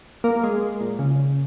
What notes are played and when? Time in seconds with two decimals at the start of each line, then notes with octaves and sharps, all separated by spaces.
0.24 A#3
0.44 G#3
0.81 A#2
0.99 C#3